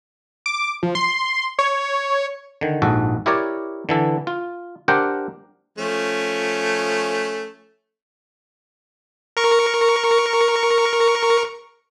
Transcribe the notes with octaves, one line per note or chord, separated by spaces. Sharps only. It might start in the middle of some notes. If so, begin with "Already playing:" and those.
D6
F3
C6
C#5
D3 D#3
A#1 G#2 F#4 A4
E4 G4 A#4 C#5 D5
D3 E3 A4
F4
D4 G4 A#4 C5 F#5 G5
F3 A3 C#4
A#4 C#6